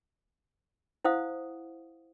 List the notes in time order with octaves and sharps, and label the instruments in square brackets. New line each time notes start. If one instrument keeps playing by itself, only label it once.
[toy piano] E4 C5 F5 F#5 D#6